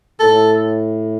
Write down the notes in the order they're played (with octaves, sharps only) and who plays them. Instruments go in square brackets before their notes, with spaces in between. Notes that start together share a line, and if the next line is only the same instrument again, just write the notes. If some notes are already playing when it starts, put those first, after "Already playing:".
[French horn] A2 [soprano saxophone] A4